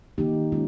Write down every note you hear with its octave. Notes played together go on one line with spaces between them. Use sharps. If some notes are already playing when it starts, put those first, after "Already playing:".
D#3 A#3 D#4 G4
D#3 G#3 C#4 F4